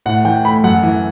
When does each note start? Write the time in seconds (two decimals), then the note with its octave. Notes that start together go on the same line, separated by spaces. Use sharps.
0.06 A2 F#5
0.25 E3 G5
0.44 A3 B5
0.64 F#2 F#5
0.83 E3